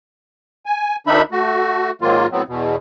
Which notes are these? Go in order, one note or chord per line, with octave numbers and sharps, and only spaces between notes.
G#5
D2 D#3 D4 D#4 E5 B5
A3 F#4
G#2 D#3 F#3 A#3 F4
A2 F#3 B3 C4
E2 B2